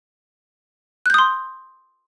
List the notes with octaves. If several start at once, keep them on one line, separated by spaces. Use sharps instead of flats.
C6 D#6 F#6 G6